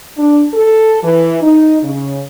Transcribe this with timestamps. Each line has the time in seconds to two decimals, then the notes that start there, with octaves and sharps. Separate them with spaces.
0.18 D4
0.54 A4
1.03 E3
1.42 D#4
1.83 C#3